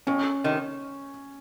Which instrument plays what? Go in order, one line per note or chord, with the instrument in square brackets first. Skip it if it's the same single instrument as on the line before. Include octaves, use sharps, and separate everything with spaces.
[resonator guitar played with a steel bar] F2 [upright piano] C#4
[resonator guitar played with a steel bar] C3 D#3